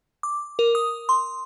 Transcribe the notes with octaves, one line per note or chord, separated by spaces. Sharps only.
D6
A#4
D#6
C6